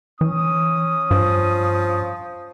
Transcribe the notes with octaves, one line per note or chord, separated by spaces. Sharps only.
E3 C#4 D#6
G2 F3